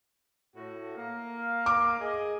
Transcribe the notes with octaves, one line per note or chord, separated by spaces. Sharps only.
A2 F#4
A#3 F5
D6
G#4 D#5